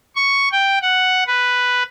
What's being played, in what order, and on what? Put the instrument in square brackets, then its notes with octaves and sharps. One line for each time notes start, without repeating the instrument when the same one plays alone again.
[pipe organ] C#6
G5
F#5
B4